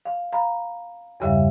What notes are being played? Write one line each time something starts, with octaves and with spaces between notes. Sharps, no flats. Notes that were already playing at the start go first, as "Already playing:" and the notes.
F5
F5 A#5 B5
E2 G2 C#3 G3 E5 F5